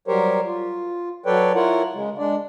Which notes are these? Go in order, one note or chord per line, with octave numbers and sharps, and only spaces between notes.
F#3 G3 G4 A#4 C5 C#5
F4
F#3 A4 B4 C#5 D5 G5
E4 F4 A#4 C#5 F#5
C#3 G#3
G#3 D4 D5